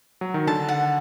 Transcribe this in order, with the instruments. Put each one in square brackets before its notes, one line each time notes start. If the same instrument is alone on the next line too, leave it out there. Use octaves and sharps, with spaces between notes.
[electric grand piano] F#3
D#3
[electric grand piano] D3 [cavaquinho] A5
[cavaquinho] F#5